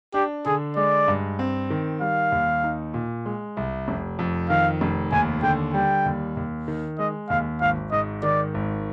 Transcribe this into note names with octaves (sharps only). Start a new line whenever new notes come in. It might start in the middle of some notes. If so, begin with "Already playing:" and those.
D4 G4
D3 G#4
G#3 D5
G2
C4
D#3
G3 F5
D#2
D#4
A#2
G#3
C2
F1
F2
D#3 F5
F1
D#2 G#5
D3 G5
G3 G5
D#2
D#2
D#3
G#3 D#5
D#2 F5
G#1 F5
G#2 D#5
D#3 D5
G#1